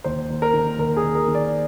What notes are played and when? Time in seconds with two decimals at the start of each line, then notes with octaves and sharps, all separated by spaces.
0.04 D#2 C5
0.30 D#2
0.42 A#4
0.53 D#3
0.78 D#2 A#4
0.97 G#4
1.03 D#2
1.15 A#4
1.28 D#3
1.35 D5